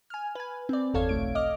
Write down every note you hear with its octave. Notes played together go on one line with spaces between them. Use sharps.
G#5 F6
B4 G#5
C4 D5
G1 E2 A4 C#5 F5 G#6
B1 A3 D7
D#5 D6 F6